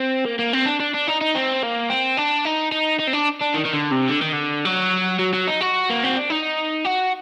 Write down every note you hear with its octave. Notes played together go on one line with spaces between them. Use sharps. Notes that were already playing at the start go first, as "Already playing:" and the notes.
Already playing: C4
A#3
A#3
C4
D4
D4
D4
D#4
D#4
C4
A#3
C4
D4
D#4
D#4
D#4
C4
D4
D4
D#3
D#3
D3
C3
D3
D#3
D3
F#3
F#3
F#3
D#4
F#4
A#3
C4
D4
D#4
F#4